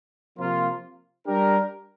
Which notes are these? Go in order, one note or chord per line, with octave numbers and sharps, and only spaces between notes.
C3 F3 A#3 F4
G3 D4 G4 A#4